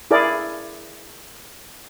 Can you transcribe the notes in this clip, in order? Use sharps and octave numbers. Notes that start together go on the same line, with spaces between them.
E4 G#4 A#4 D5